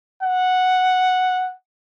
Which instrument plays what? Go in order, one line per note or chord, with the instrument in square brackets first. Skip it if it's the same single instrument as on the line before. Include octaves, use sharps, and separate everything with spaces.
[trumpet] F#5